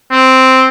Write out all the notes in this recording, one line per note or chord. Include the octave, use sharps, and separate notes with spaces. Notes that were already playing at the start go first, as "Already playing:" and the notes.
C4